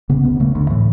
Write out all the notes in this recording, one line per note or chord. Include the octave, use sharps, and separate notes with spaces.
C#3 B3
D2 B3
C#3 A3
D2 D3
A2 E3